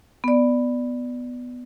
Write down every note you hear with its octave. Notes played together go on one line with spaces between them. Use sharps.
B3 D5